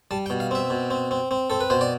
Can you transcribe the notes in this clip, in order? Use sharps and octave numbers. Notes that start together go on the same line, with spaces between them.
G3 A5
G5
B2
F5
C4 E5
B2
C4
C4
C4
C4 A4
B4
B2 C5
D5